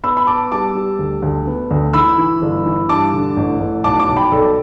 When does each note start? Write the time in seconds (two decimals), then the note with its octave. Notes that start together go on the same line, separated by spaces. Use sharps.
0.04 B3 B5 E6
0.17 B5
0.27 B3 A5 D6
0.52 G3 A5 D6
0.75 G3
0.99 D2
1.22 D2
1.47 B3
1.70 D2
1.93 E3 B5 E6
2.18 E3
2.42 G1
2.66 E3
2.89 G2 A5 D6
3.13 D3
3.37 A1
3.60 A1
3.84 B1 A5 D6
4.00 A5 D6
4.09 B1
4.17 G5 B5
4.32 B1 A4 D5